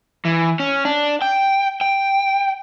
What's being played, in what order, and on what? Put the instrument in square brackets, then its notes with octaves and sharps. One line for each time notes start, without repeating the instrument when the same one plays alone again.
[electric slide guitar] E3
C#4
D4
G5
G5